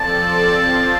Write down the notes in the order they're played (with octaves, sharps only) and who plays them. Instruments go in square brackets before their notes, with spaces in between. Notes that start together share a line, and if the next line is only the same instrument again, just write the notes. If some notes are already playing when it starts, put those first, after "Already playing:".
Already playing: [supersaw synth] F3 C4 A4 D5 [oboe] A5
[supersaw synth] F3 C4 F4